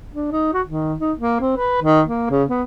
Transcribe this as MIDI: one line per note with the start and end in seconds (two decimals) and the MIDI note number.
0.14 0.30 62
0.31 0.49 63
0.53 0.62 66
0.67 0.94 51
1.00 1.12 63
1.19 1.37 58
1.40 1.52 60
1.57 1.81 71
1.82 2.02 51
2.07 2.28 58
2.30 2.44 49
2.49 2.63 59